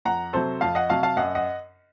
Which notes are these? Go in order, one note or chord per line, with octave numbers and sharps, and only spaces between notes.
F2 F#5 A#5
C3 F#3 A4 C5
F2 F5 A5
D#5 F#5
C3 F#3 F5 A5
F5 A5
F#2 D#5 F#5
D#5 F#5